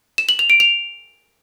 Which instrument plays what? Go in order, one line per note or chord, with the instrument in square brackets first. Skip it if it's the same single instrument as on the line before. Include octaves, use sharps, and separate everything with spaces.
[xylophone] E7
F#7
F7
D7
F7